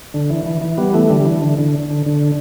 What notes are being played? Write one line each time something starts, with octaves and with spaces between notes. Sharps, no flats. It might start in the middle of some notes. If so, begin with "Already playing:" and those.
D3
E3
E3
E3
G3 B3
E3 A3
D3 G3
G3
E3
D3
D3
D3
D3